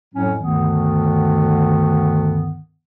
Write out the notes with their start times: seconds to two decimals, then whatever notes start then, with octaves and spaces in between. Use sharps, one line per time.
0.14 F2 A2 F#3 C#4
0.39 D2 G2 D3 D#3 B3